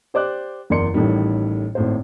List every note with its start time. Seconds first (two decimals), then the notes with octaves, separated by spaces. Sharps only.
0.14 G4 C5 D5 D6 F#6
0.70 F#1 E2 A#4 D5 C6 C#7
0.94 A1 A2 D#3 G3
1.75 G#1 A2 C5